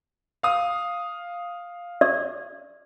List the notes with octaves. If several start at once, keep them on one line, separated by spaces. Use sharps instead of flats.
F5 D#6
D5